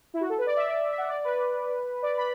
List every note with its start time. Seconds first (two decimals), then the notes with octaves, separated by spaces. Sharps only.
0.14 E4
0.21 F#4
0.29 A4
0.38 B4
0.46 D5
0.56 E5
0.67 D5
0.91 E5
0.98 F#5
1.09 D5
1.24 B4
2.02 D5
2.17 B5